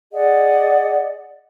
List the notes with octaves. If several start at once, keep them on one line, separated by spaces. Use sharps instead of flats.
G#4 D5 D#5 F#5